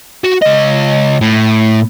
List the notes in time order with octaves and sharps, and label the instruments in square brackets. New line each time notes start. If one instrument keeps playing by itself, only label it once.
[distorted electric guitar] F#4
C#2 D#5
A2